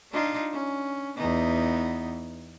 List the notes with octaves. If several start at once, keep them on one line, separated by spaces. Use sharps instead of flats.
D4 D#4 F4
C#4
E2 B3 D#4